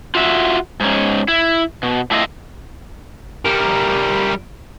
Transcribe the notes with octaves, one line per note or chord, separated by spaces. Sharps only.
F4 F#4 E5
G#2 C#4
E4
B2
A2 E4 F4 C#5 D#5
G3 A#4